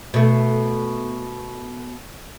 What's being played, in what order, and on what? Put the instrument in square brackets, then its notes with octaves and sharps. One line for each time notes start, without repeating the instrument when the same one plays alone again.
[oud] B2 A3